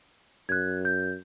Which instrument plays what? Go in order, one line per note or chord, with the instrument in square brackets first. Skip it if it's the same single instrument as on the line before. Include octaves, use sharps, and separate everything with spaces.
[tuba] F#2 [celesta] F#6 G#6
[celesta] G6